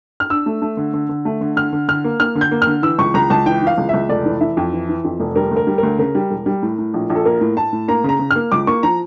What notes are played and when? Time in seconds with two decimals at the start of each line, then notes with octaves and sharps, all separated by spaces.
0.20 F6
0.30 D4 E6
0.46 A3
0.62 A3
0.77 D3
0.94 D3
1.09 D3
1.25 A3
1.41 D3
1.56 D3 F6
1.73 D3
1.88 D3 F6
2.04 A#3
2.20 A#3 F6
2.35 D3
2.41 G6
2.51 A#3
2.62 F6
2.67 D3
2.82 E3 E6
2.98 C#2 C#6
3.14 C#2 A#5
3.30 C#2 A5
3.46 E3 G5
3.62 E3 F5
3.78 C#2
3.89 C#2 E5
4.09 F1 D5
4.25 E3
4.41 E3 E5
4.57 F2
4.72 E3
4.89 E3
5.04 F2
5.20 F1
5.36 G3 A#4
5.51 D2
5.57 A#4
5.67 G3
5.78 D2 A#4
5.99 C#3 A#4
6.15 G3
6.30 E1
6.46 G3
6.62 A2
6.78 A2
6.94 A#1
7.10 A#1
7.15 A4
7.25 A#3 A#4
7.41 A2
7.57 A2 A5
7.72 A2
7.88 A#3 A#5
8.04 C#3 A#5
8.19 C#3
8.31 F6
8.36 A#3
8.52 C#2 D6
8.67 A#3 C#6
8.83 F3 A#5